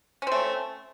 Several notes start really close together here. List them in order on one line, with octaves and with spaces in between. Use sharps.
C#4 C4 A3